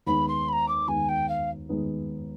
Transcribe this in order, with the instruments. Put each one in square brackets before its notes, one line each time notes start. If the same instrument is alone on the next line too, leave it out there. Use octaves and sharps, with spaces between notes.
[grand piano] D#2 D#3 G#3 B3 D#4 [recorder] B5
[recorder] C6
B5
A#5
D6
[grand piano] D#2 D#3 G#3 B3 D#4 [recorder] G#5
[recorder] G5
F5
[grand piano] D#2 D#3 G#3 B3 D#4